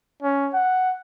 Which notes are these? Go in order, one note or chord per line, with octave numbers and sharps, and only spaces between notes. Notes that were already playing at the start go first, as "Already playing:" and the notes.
C#4
F#5